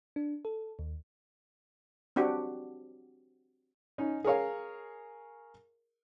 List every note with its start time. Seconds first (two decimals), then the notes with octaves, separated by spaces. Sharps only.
0.16 D4
0.45 A4
0.79 D#2
2.16 C4 D4 F#4 G4
3.98 C#4 D#4
4.24 G#4 A#4 C#5 F5